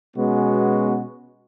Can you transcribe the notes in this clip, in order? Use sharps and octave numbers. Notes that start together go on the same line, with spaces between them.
B2 G#3 B3 C#4 F#4